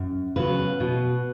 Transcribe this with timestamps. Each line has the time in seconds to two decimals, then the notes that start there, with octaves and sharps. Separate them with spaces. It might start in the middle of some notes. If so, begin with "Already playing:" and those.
Already playing: F#2
0.36 C#3 F#3 B3 B4
0.80 B2